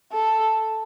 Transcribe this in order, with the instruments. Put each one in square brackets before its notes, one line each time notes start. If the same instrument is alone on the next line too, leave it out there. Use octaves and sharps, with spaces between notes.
[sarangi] A4